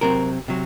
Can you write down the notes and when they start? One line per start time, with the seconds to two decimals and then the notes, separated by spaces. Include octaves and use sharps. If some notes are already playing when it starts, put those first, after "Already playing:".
0.01 C3 F#3 C4 A#4
0.48 C3 F#3